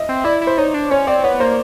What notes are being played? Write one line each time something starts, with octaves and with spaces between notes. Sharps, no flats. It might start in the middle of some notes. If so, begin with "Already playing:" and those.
Already playing: D#5 E5
C4
E4 D5
E4
C5
D#4 C#5
D4
C#4 C#5
C4 D5
B3 C#5
A#3 C5